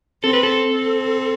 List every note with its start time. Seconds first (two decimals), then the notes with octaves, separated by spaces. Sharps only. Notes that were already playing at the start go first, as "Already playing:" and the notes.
0.24 C4 A4
0.33 B4
0.43 A4
0.67 C4